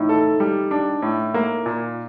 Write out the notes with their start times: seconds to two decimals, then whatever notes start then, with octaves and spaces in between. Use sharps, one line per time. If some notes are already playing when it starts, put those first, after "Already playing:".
Already playing: A2 D#4
0.09 A4
0.40 G3
0.71 D4
1.02 A2
1.34 A#3
1.66 A#2